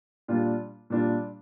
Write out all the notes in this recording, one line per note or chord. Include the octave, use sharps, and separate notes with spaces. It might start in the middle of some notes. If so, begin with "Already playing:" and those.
A#2 G3 D4 F4
A#2 G3 D4 F4